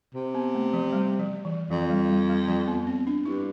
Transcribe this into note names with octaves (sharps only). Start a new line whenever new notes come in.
C3
B3
A3
F3
G3
F3
E3
F2 F3
G3
G3
G3
F3
B3
C4
D4
G2 E4